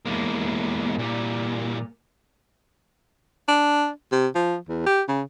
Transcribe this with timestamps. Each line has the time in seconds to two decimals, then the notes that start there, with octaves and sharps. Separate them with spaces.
0.06 E2 G#3 A#3 E4
0.99 A#2 E3 G3
3.48 D4
4.12 C3
4.35 F3
4.69 E2
4.87 G4
5.09 C#3